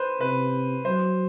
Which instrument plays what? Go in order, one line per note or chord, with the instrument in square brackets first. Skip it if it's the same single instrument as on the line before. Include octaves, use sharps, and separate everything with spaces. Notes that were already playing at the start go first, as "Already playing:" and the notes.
Already playing: [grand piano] B4 C5
[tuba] C3 [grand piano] B4
[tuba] F#3 [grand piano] C5